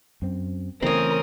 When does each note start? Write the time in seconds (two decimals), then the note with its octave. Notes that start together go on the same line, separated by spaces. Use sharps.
0.22 F#2 C4
0.82 C#3 E3 A3 C4 C#4 A#4 D#6